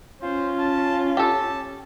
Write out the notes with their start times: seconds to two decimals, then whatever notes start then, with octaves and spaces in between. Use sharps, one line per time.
0.23 C#4 F4 C5
0.59 A5
1.17 G4 A4 A5